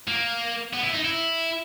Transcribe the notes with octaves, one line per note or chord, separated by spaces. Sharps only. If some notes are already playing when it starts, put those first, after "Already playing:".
A#3
B3
E4
D#4
E4